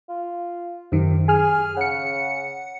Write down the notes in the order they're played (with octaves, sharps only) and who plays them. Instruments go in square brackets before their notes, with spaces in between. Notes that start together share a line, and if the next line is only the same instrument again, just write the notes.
[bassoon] F4
[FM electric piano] F#2 D#3 [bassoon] C3
[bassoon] G#4 [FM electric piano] G#5 F6
[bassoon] C#3 [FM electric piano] F#5 C#7